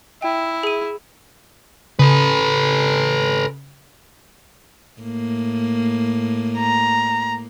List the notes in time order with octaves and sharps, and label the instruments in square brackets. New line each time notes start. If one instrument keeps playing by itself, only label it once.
[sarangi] E4 [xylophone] G5
[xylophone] G#4 D#7
[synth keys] C#3 [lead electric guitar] A4 B4
[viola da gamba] A2 A#3
[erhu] A#5